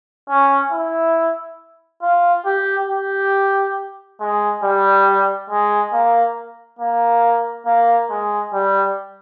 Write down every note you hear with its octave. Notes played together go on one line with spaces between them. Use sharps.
C#4
E4
F4
G4
G4
G#3
G3
G#3
A#3
A#3
A#3
G#3
G3